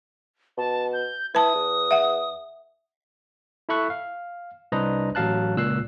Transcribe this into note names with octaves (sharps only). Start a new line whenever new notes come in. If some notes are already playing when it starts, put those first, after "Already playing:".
B2 A5
G6
E4 B4 A5 D#6
E2
E5 F#5
E4 A4 E5 B5 C#6 F#6
F5
C2 D4 B4 C5 D#5 A#5
A1 F#3 F5 A5 F#6
C#2 A#2 E6 F#6 C7